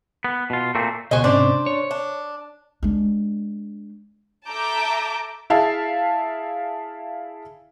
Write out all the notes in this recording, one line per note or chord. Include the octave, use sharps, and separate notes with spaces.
B3
B2 F4
A#2 A3 A#3 C4
C#2 B2 F#4 C5 D#5 G#5
G#2 C3 C#4 D4 C5 D5
C#5
D4
G#3 D4
A4 E5 A5 A#5 D6 G6
E4 G#4 E5 F5 A5